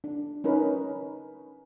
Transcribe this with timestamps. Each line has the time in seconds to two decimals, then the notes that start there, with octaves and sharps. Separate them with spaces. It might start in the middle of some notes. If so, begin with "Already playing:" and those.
0.04 D4
0.44 C#4 D#4 A#4 B4